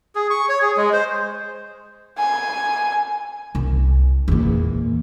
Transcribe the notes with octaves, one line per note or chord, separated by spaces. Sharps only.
G#4
C#6
C#5
G#4
G#3
C5
G#5
C2
E2 A#2